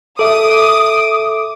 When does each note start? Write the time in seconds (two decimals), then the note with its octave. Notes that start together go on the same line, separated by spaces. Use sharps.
0.19 A4 E5 D6 D#6